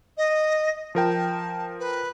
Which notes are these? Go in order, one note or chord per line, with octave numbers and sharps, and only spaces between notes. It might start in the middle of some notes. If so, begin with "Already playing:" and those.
D#5
F3 A#4 G5 A5
B4